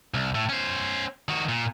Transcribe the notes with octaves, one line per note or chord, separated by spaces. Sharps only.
C2
A2
C#4 C5
D#3 F#4
A#2